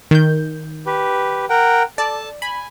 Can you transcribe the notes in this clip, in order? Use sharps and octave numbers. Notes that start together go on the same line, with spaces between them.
D#3 G6
G4 B4
A#4 F#5 G5
A4 D5 A5
G#5 B5